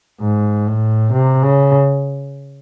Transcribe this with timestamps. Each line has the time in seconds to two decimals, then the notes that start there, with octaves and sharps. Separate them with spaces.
0.21 G#2
0.67 A2
1.12 C3
1.43 C#3